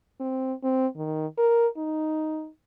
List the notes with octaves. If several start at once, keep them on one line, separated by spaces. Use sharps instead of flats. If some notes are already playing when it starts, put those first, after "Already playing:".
C4
C4
D#3
A#4
D#4